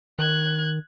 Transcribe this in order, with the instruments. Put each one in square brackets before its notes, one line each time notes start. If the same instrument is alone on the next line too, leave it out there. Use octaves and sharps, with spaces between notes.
[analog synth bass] D#3 [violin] F#6 G#6